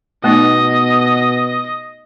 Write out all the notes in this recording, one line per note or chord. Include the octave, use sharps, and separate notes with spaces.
B2 A3 B3 D#4 D#5